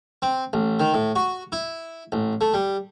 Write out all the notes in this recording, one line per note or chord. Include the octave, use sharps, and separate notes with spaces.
C4
A1
D#3
A2
F#4
E4
A1
A3
G3